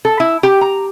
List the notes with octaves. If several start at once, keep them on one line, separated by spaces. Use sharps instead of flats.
A4
E4
G4
A#5